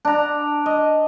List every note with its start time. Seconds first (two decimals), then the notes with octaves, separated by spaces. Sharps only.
0.05 D4 A#5
0.66 D#5